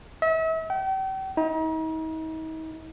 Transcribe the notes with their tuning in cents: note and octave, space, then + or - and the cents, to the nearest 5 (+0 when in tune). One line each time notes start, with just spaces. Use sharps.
E5 -40
G5 -40
D#4 +40